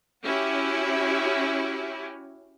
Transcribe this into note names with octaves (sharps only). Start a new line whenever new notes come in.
C#4 E4 F#4 G4